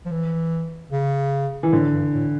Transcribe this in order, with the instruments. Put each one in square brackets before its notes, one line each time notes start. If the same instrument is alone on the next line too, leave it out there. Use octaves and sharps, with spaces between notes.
[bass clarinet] F3
E3
C#3
[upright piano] E3
[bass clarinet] A2 [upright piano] D3
[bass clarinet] G2
A2